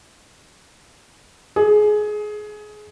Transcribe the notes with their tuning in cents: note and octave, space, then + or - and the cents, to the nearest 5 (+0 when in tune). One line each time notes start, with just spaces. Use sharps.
G#4 +20